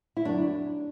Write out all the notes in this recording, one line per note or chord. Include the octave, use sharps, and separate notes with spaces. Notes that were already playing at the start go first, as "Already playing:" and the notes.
E4
F#2 D3 F#3 D4